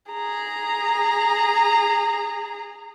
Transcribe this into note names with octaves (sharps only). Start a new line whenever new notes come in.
G#4 A#5